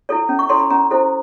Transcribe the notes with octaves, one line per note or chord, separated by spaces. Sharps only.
E4 A4 C#5
C#4
C#6
E4 A4 C#5 C6
B5
C#4 A#5
E4 A4 C5